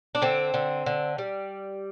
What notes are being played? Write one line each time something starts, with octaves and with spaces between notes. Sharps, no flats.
D4
D3 C4
D3
D3
G3